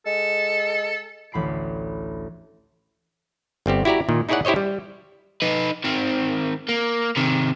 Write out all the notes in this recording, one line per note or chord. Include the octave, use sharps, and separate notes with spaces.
G#3 A4
A1 D2 B5 C7 D7
G1 G3 C4 G4
E4 F#4 G4 D5 A#5
A#2 D#3
D#4 E4 G#4 C#5 D5 F#5
E4 G4 C5 C#5 D#5
G3
D#4 B4
D#3 C4
A#3
C3 D#3